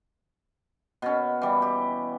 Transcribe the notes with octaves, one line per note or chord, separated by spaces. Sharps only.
B2 C#4
E3 G3
G4